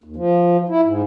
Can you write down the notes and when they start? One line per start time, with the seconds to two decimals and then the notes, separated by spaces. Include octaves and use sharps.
0.04 D#2
0.16 F3
0.69 E4
0.83 G#2